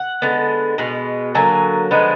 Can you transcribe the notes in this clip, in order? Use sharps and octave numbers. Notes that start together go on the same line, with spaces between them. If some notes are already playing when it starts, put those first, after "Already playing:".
Already playing: F#5
D3 G#3 B3
B2 G#3 B3
D3 F#3 A#3 G#5
D3 F3 G#3 B3